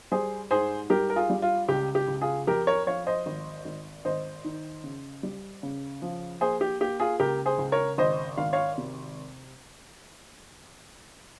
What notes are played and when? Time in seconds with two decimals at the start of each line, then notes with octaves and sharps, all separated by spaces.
0.11 G3 G#4 C5
0.51 G#2 G#4 C5
0.90 G3 G4 A#4
1.10 A#4
1.16 F4 G#4
1.30 G3
1.42 F4
1.68 C#2 G4
1.95 G4
2.08 C#2
2.21 F4 G#4
2.47 F2 G4 A#4
2.67 A#4 C#5
2.87 F3 C#5 F5
3.07 C5 D#5
3.26 G#1
3.65 G#1
4.05 G#1 C5 D#5
4.44 D#3
4.84 C#3
5.23 G3
5.63 C#3
6.02 F3
6.41 A#3 G#4 C5
6.61 G4
6.81 A#3 G4
7.00 F4 G#4
7.19 C#2 G4 A#4
7.46 G#4 C5
7.59 C#2
7.72 A#4 C#5
7.98 G#1 C5 D#5
8.38 G#1 F5
8.53 C#5 F5
8.78 C3